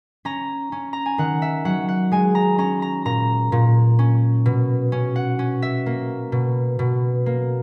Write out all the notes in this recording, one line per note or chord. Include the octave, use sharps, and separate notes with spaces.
C#4 A#5
C#4
A#5
G#5
D#3 F#5
E5
F#3 F#5
F#5
G#3 G#5
A#5
C#4 A#5
A#5
A#2 A#5
A#2
C#4
B2
C#4
F#5
C#4
E5
A#3
B2
B2
A#3